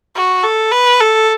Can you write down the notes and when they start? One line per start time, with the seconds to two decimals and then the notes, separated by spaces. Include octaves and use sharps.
0.16 F#4
0.44 A4
0.72 B4
1.01 A4